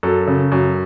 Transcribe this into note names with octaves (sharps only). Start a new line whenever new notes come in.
F#2 A4
C#3
F#2